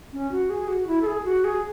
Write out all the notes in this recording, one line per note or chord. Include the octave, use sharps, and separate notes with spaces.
C#4
F#4
G#4
F#4
E4
A4
G#4
F#4
G#4